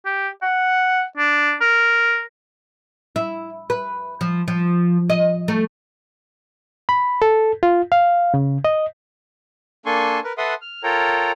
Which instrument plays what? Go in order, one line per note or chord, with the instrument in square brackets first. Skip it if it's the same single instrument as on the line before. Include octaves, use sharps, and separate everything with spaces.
[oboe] G4
F#5
D4
A#4
[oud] E4
B4
F3
F3
D#5
A3
[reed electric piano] B5
A4
F4
F5
C#3
D#5
[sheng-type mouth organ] A#3 D4 A4 G#5 C6 C#6
A#4 B4
A4 B4 E5 F#5 C6 D#6
F6
F4 A4 A#4 C#5 G5 A#5